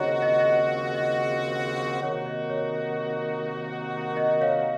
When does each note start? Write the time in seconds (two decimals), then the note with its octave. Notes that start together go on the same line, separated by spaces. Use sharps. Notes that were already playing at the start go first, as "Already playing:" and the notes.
Already playing: D#2 C#3 F3 C4 F#4 C#5 D#5 A#5
0.22 D#5
0.40 D#5
0.94 D#5
2.02 C3 D#3 A#3 D#4 F#4 C#5
2.26 D#5
2.50 C#5
4.17 D#5
4.41 C#5 F5